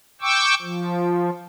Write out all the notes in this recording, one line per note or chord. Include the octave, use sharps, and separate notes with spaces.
G5 C#6 D6 E6
F3